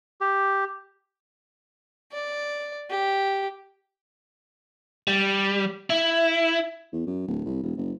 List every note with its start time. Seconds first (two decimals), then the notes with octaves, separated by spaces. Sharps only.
0.21 G4
2.12 D5
2.90 G4
5.08 G3
5.90 E4
6.93 E2
7.07 F#2
7.27 D1
7.46 C2
7.63 E1
7.77 F#1